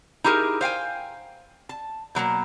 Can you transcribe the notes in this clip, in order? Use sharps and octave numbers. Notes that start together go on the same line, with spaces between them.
D#4 E4 G4 G#4 A#4
C5 F5 G5 G#5
A5
B2 F#3 A3 A#3